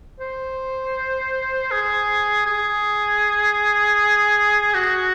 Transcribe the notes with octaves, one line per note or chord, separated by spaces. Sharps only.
C5
G#4
G#4
F#4